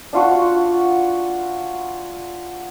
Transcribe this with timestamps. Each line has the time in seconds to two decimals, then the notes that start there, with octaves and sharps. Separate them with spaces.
0.13 D4 F4 F#4